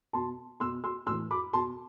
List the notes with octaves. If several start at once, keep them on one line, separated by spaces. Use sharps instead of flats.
B2 A5 C6
B2 C6 E6
C6 E6
A2 E3 C6 E6
B5 D6
B2 A5 C6